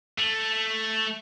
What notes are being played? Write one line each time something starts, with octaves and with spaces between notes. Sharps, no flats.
A3